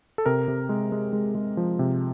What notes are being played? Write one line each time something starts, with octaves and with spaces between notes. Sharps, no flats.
A4
C3 A#4
C3
G#3
G#3
G#3
G#3
F3
C3